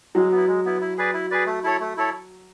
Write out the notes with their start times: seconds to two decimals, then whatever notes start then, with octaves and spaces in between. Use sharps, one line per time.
0.15 F#3 G#3
0.32 B3 E4
0.47 G#3
0.65 B3 E4
0.81 E4
0.97 G#4 B4 D5
1.13 E4
1.31 G#4 B4 D5
1.46 A3
1.64 E4 A4 C#5
1.80 A3
1.97 E4 A4 C#5